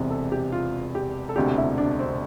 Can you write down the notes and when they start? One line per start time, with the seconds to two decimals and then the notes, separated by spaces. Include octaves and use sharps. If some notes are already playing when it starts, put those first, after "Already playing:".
Already playing: E1 E2 C3
0.11 A4
0.32 G4
0.52 F4
0.95 G4
1.29 A4
1.36 E1 D2 C3 G4
1.58 E4
1.78 D4
1.99 C4